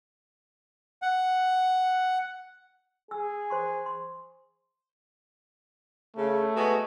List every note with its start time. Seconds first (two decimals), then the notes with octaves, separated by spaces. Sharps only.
1.02 F#5
3.11 G#4 G#5 E6
3.50 C5 C6 C#6
3.86 C6
6.16 C#3 A3
6.56 G#3 B3 F#4